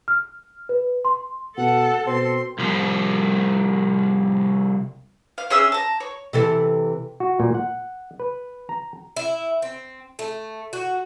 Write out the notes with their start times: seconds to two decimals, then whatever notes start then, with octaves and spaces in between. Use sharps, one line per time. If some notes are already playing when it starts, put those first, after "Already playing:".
0.08 F6
0.69 B4
1.05 C6
1.58 B2 A4 F#5
2.07 B2 C4 C6
2.59 C2 F3
5.38 F5
5.50 C#4 G#4 E5 E6
5.72 A5 A#5
6.00 C#5
6.33 C3 E3 A4
7.20 F#4
7.40 A#2
7.55 F#5
8.20 B4
8.69 A#5
9.16 E4
9.62 C4
10.19 A3
10.73 F#4